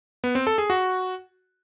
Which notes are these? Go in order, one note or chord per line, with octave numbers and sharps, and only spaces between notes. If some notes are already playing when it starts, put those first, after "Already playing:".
B3
C4
A4
G#4
F#4